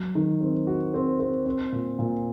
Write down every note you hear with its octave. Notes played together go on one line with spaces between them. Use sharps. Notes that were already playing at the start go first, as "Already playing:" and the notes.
Already playing: F#3
D#3
C4
F#4
C4
C4
C4
A#2
A#2